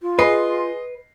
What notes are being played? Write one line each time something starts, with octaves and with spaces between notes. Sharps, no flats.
F4
G#4 B4 D#5 C6 C7